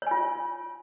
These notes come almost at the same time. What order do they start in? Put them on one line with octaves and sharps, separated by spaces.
C#5 G#5 F4